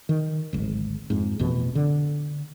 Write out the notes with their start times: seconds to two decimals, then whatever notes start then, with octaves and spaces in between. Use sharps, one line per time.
0.09 D#3
0.53 D1 G#1
1.10 F2 G#2
1.39 A1 F2 B2
1.75 D3